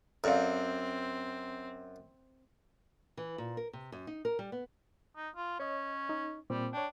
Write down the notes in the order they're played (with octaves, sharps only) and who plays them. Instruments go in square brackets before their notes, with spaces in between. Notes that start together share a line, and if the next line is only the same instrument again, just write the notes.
[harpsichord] F#2 [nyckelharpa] C4 [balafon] A4 D5 F5
[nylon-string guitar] E3
A#2
A#4
C3
F#2
D#4
A#4
G3
B3
[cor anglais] D#4
F4
[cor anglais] C#4 [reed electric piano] C#5 D#5
[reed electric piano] D#4
[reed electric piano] A#2 C4 [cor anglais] G3
[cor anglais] D4 [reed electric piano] C#5 G5